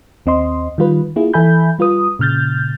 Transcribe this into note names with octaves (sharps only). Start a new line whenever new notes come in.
D#2 C4 D#5 C6
D#3 G3 F4 B4
A#3 E4 F4 G#4
E3 A4 E5 G#5 B5 G6
G3 F4 B4 D#6
A#2 C#3 F6 G6 A6